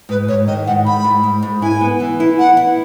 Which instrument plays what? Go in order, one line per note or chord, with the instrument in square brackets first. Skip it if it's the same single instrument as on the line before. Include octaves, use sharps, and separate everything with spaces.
[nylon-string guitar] G#2 [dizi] B4
[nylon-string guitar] G#2 [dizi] C#5
[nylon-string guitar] D#3 [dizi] D#5
[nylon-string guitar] G#2 [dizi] F#5
[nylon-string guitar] G#2 [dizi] B5
[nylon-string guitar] G#2
G#2
G#2
[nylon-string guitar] E4 [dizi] G#5
[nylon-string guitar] B3
E3
E4
[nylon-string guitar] B3 [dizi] F#5
[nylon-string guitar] E4